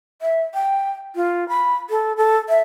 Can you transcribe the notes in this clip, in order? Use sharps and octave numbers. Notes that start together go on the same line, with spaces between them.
E5
G5
F4
B5
A4
A4
E5